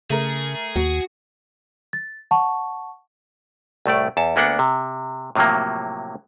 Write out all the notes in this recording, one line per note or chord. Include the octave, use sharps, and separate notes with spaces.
C#3 A3 G#4 A#4
D#2 F#4
A6
F#5 A5 C#6
C2 A2 A3 D5
E2 A5
D2 A#3 B3 D4 F#5
C3
A2 C3 F3 F#3 A#3